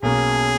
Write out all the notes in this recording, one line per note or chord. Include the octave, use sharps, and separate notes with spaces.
B1 B2 A#3 C#4 G#4